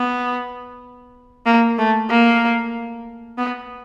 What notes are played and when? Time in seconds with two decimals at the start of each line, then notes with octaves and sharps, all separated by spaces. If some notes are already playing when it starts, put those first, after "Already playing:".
Already playing: B3
1.46 A#3
1.78 A3
2.10 A#3
3.38 B3